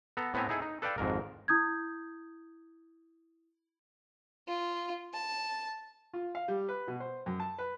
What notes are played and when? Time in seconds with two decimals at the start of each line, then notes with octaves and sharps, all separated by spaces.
0.17 B3 A4 A#5
0.34 A2 B3 C4 E5 G#5 A#5
0.49 D#4 E4 G#4 A4
0.62 D#4
0.82 A4 B4 D5 F5 G5 A5
0.98 G#1 F2 G#2 A#4
1.48 E4 D#6 G6 G#6
4.48 F4
5.13 A5
6.13 F4
6.35 F5
6.48 G3
6.69 B4
6.88 B2
7.00 C5
7.26 F#2
7.40 A5
7.58 B4